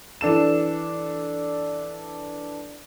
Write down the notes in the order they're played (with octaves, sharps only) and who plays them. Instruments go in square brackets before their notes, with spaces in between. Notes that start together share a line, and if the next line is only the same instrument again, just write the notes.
[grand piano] E3 D4 A4 E7